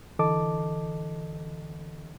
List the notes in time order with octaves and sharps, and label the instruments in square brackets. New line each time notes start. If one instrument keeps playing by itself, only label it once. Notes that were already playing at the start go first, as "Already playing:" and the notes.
[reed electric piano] D3 E3 A4 D#5 A5 D6